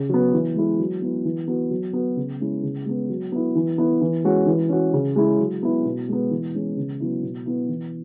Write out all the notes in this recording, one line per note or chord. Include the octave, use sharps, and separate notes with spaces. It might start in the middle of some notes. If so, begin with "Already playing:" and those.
Already playing: C#3
F#3 B3
E3
G#3 E4
F#3
B3 E4
E3
B3 F#4
F#3
B3 F#4
C#3
G#3 C#4 E4
C#3
G#3 B3
F#3
B3 E4
E3
B3 E4
E3
G#3 C#4 F#4
E3
C#4 F#4
C#3
G#3 E4
F#3
B3 E4
B2
G#3 B3
E3
G#3 C#4
C#3
F#3 B3 E4
B2
B3 E4
E3